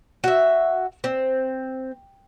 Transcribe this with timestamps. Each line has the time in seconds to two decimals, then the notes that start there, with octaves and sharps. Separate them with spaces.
0.24 F#4 E5
1.04 C4